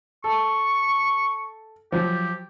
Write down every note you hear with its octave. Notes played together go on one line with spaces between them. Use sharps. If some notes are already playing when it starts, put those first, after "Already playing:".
A4 C#6
F3 F#3 G4